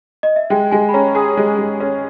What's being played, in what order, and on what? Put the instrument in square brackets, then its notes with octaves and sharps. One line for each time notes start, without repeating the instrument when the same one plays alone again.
[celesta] D#5
E5
[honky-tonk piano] G#3 [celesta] G5
[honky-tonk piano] G#3 [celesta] G#5
[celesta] B5
[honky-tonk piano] C#4 [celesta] A#5
[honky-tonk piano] G#4 [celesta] D#6
[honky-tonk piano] G#3
G#3
C#4